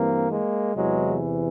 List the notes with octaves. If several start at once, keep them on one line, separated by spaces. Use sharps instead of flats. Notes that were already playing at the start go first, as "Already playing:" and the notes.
Already playing: G2 E3 A#3 C4
G#3 A#3
E2 C3 E3 F#3 G#3